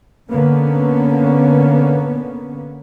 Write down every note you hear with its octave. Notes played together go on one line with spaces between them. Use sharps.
D3 A#3 B3 C#4